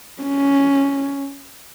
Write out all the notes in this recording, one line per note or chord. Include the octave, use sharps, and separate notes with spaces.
C#4